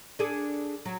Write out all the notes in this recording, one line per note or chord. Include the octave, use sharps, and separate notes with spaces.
D4 G#4 A4
F#3